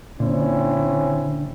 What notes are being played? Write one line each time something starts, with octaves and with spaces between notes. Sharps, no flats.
A#2 D3 C4 C#4 E4